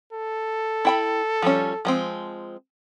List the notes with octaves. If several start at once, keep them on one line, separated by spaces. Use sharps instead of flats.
A4
E4 G5 B5
F3 G3 C#4
F3 G#3 C4